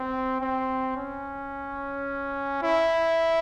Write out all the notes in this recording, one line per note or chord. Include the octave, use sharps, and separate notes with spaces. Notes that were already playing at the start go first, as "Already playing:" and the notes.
Already playing: C4
C4
C#4
E4